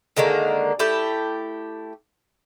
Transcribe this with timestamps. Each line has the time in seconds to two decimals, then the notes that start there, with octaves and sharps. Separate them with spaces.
0.17 D3 D#3 G#3 A#3
0.79 A3 E4 G4